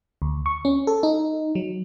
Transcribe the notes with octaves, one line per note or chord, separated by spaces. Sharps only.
D2
C#6
C#4
A4
D#4
F#3